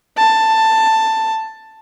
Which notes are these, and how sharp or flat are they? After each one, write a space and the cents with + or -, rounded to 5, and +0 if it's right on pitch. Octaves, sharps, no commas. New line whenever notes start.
A5 +10